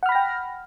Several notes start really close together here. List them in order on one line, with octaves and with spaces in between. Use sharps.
F#5 F6 B5 A#6 G5